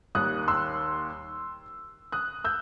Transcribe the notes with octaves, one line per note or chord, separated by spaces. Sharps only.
D#2 D#3 G3 D#6 F#6
C6 E6
D#6 F#6
E6 G6